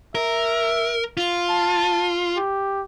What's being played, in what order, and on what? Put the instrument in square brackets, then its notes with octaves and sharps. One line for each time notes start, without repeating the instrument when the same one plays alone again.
[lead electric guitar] A#4 [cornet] E5
[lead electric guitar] F4
[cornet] A5
G4